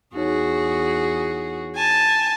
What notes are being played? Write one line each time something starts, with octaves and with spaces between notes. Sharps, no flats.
E2 D#4 F#4 G#4 C#5
G#5 A5